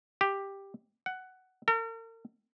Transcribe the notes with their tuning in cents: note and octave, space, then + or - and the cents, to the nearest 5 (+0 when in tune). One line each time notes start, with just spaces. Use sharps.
G4 +5
F#5 +10
A#4 -45